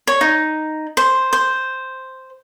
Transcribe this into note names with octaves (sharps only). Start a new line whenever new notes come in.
C#5
D#4
C5
C5